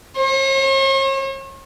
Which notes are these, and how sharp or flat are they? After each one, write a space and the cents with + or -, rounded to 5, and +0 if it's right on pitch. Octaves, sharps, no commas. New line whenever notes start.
C#5 -45